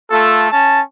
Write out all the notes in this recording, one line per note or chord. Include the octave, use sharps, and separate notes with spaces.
A3 F4 A4
C#4 A5